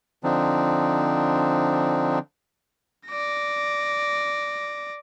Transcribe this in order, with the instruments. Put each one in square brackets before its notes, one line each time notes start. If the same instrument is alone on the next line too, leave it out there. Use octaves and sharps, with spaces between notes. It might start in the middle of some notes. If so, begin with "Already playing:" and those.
[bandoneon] D3 F3 C4 D4 D#4
[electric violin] D5 A#6